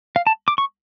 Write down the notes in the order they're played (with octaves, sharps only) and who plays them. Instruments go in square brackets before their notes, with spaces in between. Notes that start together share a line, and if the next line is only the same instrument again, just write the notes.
[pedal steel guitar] F5
A5
D6
C#6